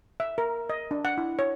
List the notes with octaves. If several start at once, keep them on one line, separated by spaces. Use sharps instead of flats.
E5
A#4
D#5
D4
F#5
E4
C#5